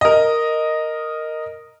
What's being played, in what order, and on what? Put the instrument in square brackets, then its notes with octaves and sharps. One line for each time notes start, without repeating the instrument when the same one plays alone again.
[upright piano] A#4 D#5